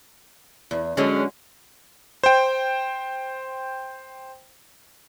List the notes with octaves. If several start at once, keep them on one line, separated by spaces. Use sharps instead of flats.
E2
D3 F#3 G#3 C#4
C5 G5